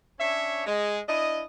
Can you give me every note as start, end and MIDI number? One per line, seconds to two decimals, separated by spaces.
0.19 0.66 61
0.19 0.66 62
0.19 0.66 73
0.19 0.66 76
0.67 1.00 56
1.08 1.44 62
1.08 1.44 64
1.08 1.44 75